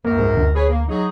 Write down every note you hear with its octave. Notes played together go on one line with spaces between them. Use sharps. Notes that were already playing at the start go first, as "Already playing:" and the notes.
C#2 F#2 A#3 A#4
G#2
D2
G#4 B4 C#5
A#3
F#3 D#4 G#4